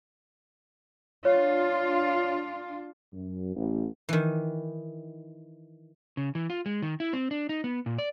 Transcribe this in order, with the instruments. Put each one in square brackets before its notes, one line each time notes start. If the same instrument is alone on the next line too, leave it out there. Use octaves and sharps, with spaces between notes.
[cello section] D4 F4 [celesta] C#5
[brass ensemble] F#2
A1
[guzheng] D#3 E3
[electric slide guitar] C#3
E3
F4
G#3
D#3
E4
C4
D4
D#4
B3
A#2
D5